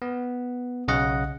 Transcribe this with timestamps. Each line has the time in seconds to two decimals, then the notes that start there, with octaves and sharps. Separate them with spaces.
0.02 B3
0.88 B1 C#3 D#5 F#5